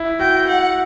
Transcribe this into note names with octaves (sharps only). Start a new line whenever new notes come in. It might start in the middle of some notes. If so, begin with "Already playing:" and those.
Already playing: E4
F#4 G5
F#5